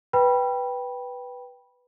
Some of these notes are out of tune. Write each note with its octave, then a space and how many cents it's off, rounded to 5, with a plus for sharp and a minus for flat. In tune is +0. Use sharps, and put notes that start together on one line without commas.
B4 +0 G5 +0 B5 -15